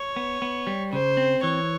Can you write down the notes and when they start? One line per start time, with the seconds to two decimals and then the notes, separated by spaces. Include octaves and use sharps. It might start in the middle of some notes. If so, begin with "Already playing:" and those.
Already playing: C#5
0.16 B3
0.42 B3
0.67 G3
0.92 C#3 C5
1.17 C4
1.43 E3 C#5